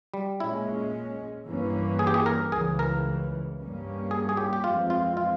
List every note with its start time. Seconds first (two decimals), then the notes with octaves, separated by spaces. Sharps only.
0.14 G3
0.40 A#2 G#3 C#4 E4
1.46 G2 E3 A#3 C#4
1.99 G#4
2.07 G4
2.14 G#4
2.26 A#4
2.52 C#2 C#3 E3 G#4
2.79 A#4
3.58 G2 G3 A#3 C#4
4.11 G#4
4.29 G#4
4.37 G4
4.53 G4
4.64 F2 E3 G#3 C4 F4
4.90 F4
5.17 F4